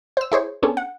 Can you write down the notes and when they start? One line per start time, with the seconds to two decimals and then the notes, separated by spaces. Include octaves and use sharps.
0.17 C5 E6
0.32 E4 G#4 C5 C#5
0.63 B3 C#4 D4 G#4 A4
0.77 F#5